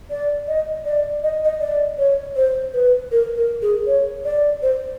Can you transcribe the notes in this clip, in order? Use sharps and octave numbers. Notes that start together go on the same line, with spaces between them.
D5
D#5
D5
D#5
D#5
D5
C#5
C5
B4
A#4
A#4
G#4
C#5
D5
C5